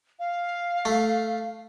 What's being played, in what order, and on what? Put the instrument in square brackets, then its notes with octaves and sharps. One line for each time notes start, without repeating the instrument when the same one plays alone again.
[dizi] F5
[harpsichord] A3